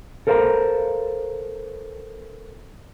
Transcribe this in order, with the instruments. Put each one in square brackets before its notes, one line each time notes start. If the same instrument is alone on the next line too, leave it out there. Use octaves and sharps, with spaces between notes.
[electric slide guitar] A4 A#4 C5 F5 A5 A#5